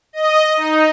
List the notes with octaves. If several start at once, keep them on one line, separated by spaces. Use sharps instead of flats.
D#5
D#4